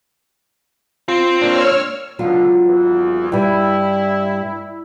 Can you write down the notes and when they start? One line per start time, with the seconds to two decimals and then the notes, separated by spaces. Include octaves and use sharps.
1.08 C4 F4
1.41 A#3 D4 C#5 E6 F6
2.19 C#2 B2 D3 F#3 F4
2.65 G#1 E2 E3
3.32 G2 G3 E4